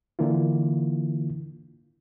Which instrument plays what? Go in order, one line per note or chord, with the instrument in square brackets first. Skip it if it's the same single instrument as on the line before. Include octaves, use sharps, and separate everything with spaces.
[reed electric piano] D3 E3 A#3 E4 F4